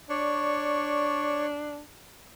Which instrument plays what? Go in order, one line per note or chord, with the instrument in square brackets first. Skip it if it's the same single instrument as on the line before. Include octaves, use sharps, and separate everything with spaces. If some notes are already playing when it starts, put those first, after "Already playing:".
[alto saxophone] D4 [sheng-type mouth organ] C#5 D5 C#6